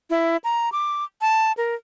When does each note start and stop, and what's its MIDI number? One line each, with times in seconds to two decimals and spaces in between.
0.10 0.37 64
0.44 0.70 82
0.72 1.04 86
1.21 1.52 81
1.57 1.75 70